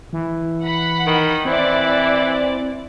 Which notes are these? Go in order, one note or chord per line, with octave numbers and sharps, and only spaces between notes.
E3
F#5 B5
D#3
E3 C4 E4 D5